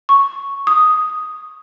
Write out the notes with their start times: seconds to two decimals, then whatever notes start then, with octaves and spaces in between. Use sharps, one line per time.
0.09 C#6
0.67 D#6